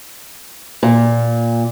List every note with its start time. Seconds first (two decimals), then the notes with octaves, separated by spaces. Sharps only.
0.83 A#2